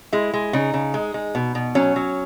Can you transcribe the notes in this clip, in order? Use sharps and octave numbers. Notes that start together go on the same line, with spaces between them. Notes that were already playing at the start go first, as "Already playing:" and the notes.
G#3 E4
G#3
C#3 D#4
C#3
G#3
G#3
B2
B2
F#3 C#4
F#3